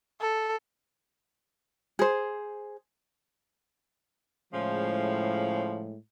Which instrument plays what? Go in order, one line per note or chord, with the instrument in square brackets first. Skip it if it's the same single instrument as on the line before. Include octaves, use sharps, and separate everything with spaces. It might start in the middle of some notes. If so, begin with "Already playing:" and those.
[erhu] A4
[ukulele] G#4 C5
[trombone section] A2 G#3 [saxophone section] C#3 F3